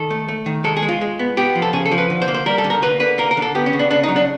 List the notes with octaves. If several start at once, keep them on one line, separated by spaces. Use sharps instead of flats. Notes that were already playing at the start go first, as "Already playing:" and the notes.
Already playing: D#3 A4
A3
A3
D#3
G#3 A4
G#4
G#3
F4
G#3
B3
B3 G4
F3
A4
C#3 G#4
A4
F3
B4
D3
C5
A#3
C5
G3 A#4
A4
D3
A#4
A#3 B4
D3 B4
A#3 A#4
A#4
D3
A4
B3 G4
C#4
C#3
D4
C#3 D4
D#4
F#3
D4